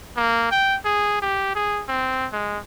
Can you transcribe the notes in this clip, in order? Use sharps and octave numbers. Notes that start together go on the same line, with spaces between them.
A#3
G5
G#4
G4
G#4
C4
G#3